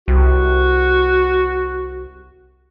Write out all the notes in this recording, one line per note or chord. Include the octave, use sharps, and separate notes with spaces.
C2 F#4